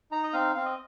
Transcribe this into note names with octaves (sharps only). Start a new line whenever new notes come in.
D#4 A#5
D#5
C4 F5
C4 F5
D#5